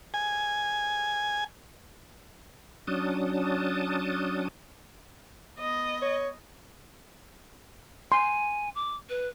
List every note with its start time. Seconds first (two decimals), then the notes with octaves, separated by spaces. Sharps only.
0.14 G#5
2.87 F#3 C#4 D4 A5 D#6
5.58 B3 D#5
6.02 C#5
8.12 G#5 C6
8.75 D6
9.09 B4